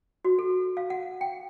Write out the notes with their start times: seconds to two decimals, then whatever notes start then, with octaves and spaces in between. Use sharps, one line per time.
0.25 F#4
0.39 A4
0.77 F5
0.90 F#5
1.21 G5